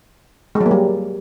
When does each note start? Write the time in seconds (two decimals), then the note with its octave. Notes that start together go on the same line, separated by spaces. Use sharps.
0.55 G#3
0.61 F#3
0.66 A#3
0.71 G3